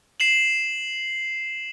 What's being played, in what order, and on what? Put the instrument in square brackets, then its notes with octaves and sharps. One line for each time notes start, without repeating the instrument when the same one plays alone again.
[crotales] C7 E7 F#7